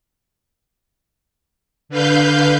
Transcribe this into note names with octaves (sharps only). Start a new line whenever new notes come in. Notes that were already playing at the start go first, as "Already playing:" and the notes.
D3 B4 F5 G6